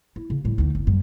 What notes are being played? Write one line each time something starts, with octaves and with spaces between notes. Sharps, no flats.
E4
C#3
A2 G3
D2 D#4
F#1
F#2 G3